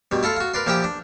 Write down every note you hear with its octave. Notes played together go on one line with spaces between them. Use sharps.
G2 B2
E4 F4 A4 F5
F4 F#4
A#4 B4 D5 C6
A#2 F3 E4 G4 G5
D4